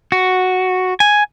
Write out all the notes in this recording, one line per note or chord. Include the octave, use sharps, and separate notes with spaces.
F#4
G#5